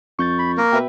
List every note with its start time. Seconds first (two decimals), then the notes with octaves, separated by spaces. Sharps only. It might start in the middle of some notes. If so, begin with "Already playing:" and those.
0.19 F2 C#6 G6 A6
0.39 B5
0.57 A#3 A#4
0.72 B2 B4 E5 G5